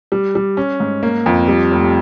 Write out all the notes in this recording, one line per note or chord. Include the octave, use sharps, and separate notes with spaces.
G3
G3
C#4
G#2
A#3
F2
G3
F1